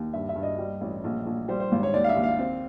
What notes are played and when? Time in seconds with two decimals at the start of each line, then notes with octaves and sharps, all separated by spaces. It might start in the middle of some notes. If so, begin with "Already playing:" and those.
Already playing: D#2
0.13 G2 E5
0.29 E5
0.35 G2
0.43 D#5
0.58 G3
0.81 A1
1.04 A#1
1.27 A#1
1.48 G3 C5
1.60 C5
1.72 G#1
1.83 C#5
1.94 D#2 D5
2.04 F5
2.09 E5
2.16 D#2
2.23 F5
2.39 C4